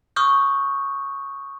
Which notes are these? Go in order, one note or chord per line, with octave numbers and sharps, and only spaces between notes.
C#6 D#6 F6 G6